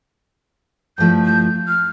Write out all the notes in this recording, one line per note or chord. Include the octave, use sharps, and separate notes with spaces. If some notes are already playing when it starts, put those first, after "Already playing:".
G2 F3 A3 E4 G6
G6
F6